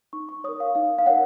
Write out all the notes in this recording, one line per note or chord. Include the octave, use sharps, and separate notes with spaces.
D#4 C#6
C#6
A#4 C#5 D#6
F5
D#4 F5
F5
A#4 C#5 F#5